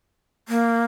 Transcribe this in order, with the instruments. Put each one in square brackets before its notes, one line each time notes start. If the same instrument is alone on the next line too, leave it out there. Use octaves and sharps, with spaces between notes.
[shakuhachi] A#3